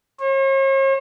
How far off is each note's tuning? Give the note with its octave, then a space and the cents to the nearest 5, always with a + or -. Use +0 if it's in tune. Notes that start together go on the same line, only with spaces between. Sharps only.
C#5 -45